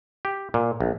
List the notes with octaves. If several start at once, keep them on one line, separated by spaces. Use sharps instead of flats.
G4
A#2
A#1